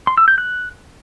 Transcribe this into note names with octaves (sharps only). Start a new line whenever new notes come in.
C6
E6
G6
F#6